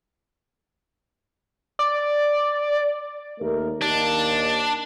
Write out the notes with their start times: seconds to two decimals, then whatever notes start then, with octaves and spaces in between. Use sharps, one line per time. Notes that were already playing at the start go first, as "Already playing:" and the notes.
1.79 D5
3.39 D#2 A3 A#4
3.82 D#2 D4